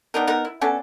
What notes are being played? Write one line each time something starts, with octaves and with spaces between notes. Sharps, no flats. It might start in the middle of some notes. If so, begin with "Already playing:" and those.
B3 D4 D#4 A#4
B3 D#4 A#4
E4
B3 C#4 D4 A4